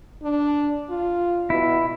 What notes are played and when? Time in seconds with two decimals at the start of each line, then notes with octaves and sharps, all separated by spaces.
0.23 D4
0.90 F4
1.50 B2 E4